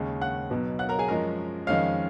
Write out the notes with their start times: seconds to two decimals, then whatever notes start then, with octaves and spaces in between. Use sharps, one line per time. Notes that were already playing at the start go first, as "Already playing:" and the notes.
Already playing: D#2 C#3 G#3 C#4
0.21 F#5 F#6
0.50 B1 B2 F#3 B3
0.79 F#5 F#6
0.89 A#4 A#5
0.99 G#4 G#5
1.08 F#2 F3 G#3 C#4 A#4 A#5
1.67 F2 D#3 G#3 C#4 F5 F6